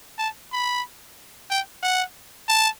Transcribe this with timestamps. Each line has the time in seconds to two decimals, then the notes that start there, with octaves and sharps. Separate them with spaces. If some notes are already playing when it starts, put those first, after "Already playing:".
0.18 A5
0.52 B5
1.50 G5
1.83 F#5
2.49 A5